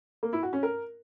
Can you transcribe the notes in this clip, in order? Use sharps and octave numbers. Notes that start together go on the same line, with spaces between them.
A#3
E4
F#4
C#4
A#4